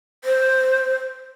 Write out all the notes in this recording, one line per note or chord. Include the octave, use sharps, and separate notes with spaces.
C5